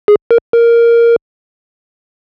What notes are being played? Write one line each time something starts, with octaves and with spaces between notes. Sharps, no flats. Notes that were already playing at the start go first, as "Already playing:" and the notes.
G#4
A#4
A#4